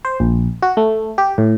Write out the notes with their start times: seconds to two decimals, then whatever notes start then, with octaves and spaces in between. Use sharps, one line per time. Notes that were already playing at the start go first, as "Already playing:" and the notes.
0.05 C5
0.20 A#1
0.62 F#4
0.77 A3
1.18 G4
1.38 A2